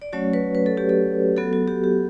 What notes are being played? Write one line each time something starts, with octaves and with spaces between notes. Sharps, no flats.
D5
F#3 A3 C#4 F#4 C#5
B4
B4
A4
G4
A4
F#3 B3 F#4 A4
F#4
G4
G4